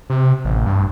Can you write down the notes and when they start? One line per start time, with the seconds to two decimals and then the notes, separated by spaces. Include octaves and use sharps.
0.10 C3
0.45 A1
0.66 G2